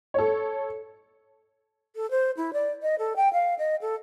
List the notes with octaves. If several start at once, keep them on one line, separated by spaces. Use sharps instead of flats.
A4 C#5
A4
C5
E4
D5
D#5
A4
G5
F5
D#5
A4